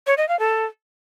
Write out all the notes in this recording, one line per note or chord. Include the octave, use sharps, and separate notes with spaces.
C#5
D#5
F5
A4